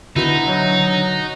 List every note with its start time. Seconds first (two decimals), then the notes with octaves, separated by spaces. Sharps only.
0.16 B2 D3 D#4 E4 C5
0.47 F#3